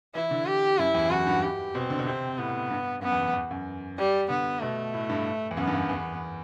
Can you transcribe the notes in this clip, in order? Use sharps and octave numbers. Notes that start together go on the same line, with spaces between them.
E3 E4
D3
G4
F#2 E4
E2
E2
F#2 F#4
G2
G4
B2 C4
D3
B2
C3 C4
A2 B3
G2
F#2 B3
E2
F#2
E2
F#2
G3
D3 B3
B2 A3
A2
G2
E2
F#2 B3
G2
F#2
E2